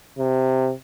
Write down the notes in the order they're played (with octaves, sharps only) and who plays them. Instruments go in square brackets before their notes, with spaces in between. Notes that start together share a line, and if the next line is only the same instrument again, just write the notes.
[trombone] C3